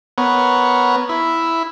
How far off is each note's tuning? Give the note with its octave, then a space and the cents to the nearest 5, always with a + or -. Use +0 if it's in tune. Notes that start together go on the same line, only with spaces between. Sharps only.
B3 +0 A#4 +0 C#5 +0
E4 +0 E5 +0